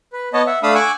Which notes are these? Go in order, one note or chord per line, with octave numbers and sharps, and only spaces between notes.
B4
B3 C#5 D#5 A5
E5 F#5
A3 D4 F5 B5 D#6 E6
F#5 G#5 C#6 D6 E6 F#6